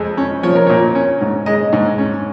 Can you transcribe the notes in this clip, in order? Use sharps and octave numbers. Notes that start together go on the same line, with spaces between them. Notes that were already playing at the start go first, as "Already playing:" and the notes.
Already playing: F2 G#3
C#4
F3 C#5
A#4
A#2 C#5
C#4
G#2
G#3 D#5
G#2
C#4